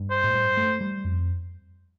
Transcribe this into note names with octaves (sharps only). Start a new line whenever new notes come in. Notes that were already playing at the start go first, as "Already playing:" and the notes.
Already playing: G2
C5
A2
G2
A3
G3
F2